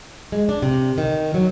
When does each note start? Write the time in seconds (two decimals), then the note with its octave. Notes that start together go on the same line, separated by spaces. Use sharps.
0.32 G#3
0.49 D4
0.62 C3
0.98 D#3
1.34 F#3